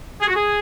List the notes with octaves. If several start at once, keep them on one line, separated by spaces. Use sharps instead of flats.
G#4
F#4
G#4